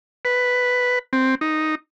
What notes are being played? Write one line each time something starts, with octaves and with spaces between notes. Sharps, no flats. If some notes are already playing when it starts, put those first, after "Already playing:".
B4
C4
D#4